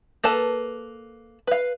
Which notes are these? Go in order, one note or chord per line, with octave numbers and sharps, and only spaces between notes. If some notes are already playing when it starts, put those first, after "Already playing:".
A#3 A4 B4 A5
B4 F5